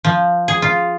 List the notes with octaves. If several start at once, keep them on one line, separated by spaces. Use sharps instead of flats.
F3
G#4
F4